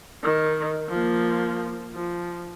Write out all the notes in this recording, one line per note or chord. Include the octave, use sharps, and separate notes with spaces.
D#3
F3 A#3
F3